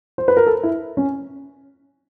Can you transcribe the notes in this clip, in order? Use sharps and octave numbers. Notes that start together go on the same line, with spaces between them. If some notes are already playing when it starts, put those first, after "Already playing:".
C5
B4
A#4
A4
E4
C#4